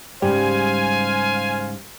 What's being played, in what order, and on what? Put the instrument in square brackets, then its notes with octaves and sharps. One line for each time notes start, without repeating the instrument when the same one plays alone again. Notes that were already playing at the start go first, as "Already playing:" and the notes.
[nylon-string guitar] G#2 C#3 G#3 [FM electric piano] G3 [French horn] C5 [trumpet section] F5 G#5